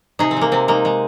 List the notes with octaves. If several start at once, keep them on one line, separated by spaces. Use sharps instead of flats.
C3 D#4 G#4
C4
G#3 A#3
C3 C4
G#3 A#3 D#4
G#3